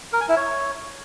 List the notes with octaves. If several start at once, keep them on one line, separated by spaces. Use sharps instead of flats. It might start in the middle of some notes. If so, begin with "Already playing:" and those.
A#4
G#5
E4
C#5